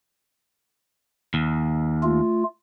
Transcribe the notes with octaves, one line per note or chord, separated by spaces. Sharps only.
D#2
A3 F4